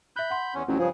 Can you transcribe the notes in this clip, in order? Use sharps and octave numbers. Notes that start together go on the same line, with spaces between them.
E5 B5 F#6 G6
F#5 C6
E2 C#4
A1 F2 F3 F#3
G2 C#3 F3 G#4